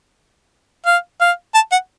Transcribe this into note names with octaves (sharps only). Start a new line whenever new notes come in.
F5
F5
A5
F#5